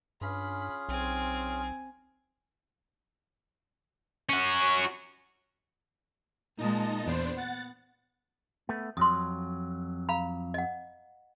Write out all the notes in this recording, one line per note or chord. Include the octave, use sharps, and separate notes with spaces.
G2 C#4 F4 G#4 B5
B1 C4 G#5
C#4 F#4
A#2 G#3 D#4 D#5 A5
E2 B3 D4 C5
F#5 A6
A3 B3
F2 F#3 C6 D#6
F5 A#5 B5
D#5 F#5